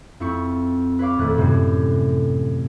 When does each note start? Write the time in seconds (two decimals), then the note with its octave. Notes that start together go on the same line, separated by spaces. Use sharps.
0.20 F2 C4 E4 C#6
0.99 B4 C#5 F5 D6
1.18 D#1 F2 A3 F#6
1.38 F#2 A2 C3 E3 F#3 G3